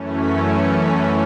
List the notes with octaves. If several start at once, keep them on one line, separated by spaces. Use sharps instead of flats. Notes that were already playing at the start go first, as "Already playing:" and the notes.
Already playing: F#2 E3 A3 C#4
B6
C#7
B6